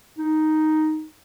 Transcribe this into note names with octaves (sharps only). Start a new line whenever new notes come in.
D#4